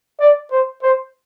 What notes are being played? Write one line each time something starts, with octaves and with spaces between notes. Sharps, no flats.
D5
C5
C5